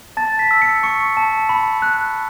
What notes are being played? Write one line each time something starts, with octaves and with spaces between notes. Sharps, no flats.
A5 A6
B6
E6
C#7
C#6 C#7
A5
B5
F#6